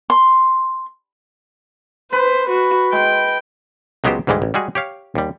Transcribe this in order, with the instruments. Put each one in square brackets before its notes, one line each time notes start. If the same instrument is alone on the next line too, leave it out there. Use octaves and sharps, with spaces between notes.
[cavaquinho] C6
[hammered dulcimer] B4 [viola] C5
[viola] F#4
[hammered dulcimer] G#3 [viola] G5
[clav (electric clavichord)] C#2 F#3 G#3 B3 G4 C5
D2 G#2 E3 G3 G#3
A1
G3 G#3 F#4 G#4
G4 C#5 F5
D#2 G3